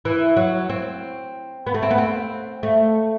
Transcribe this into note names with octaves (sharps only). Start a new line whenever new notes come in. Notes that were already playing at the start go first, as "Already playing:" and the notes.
E3
F#3
C4
B3
A3
C4
B3
C4
A3